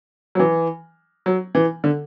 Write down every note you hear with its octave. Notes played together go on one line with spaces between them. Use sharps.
F#3
E3
F#3
E3
D3